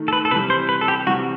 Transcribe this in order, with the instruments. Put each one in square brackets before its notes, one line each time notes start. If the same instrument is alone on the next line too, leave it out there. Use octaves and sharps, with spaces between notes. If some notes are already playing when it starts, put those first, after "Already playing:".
Already playing: [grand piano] D#3 A3 D#4
[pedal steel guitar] A4
B4
A4
[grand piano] C3 E3 G3 [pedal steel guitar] B4
[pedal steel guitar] C5
B4
A4
G4
[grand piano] C3 E3 G3 [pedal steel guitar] F#4